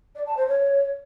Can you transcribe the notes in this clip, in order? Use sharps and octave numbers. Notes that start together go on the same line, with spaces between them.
D5
A5
C5
C#5